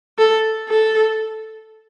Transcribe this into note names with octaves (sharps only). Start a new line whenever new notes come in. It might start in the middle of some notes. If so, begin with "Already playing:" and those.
A4
A4